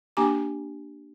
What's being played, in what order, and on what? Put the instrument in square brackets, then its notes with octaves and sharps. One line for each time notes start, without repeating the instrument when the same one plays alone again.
[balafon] A#3 D4 G4 G#5 A#5 D6